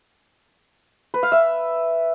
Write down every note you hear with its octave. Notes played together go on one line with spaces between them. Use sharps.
B4
F5
E5